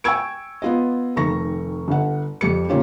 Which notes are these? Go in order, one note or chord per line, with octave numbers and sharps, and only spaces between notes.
G5 G#5 C#6 E6 G#6 D7
B3 F4 D#5
F1 D#3 A3 C#6 A#6
G1 F#5
F2 G3 C#7
A#2 D#3 C#4 F4 G4